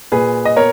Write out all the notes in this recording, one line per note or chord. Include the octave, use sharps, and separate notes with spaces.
A#2 G#4 B4
D#5
B3 A#4 C#5